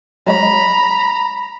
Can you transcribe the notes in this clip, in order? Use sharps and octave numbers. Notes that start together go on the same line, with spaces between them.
F#3 G#3 C#5 A#5 B5